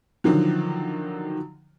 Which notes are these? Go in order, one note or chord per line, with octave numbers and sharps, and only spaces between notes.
D3 D#3 F3 F#3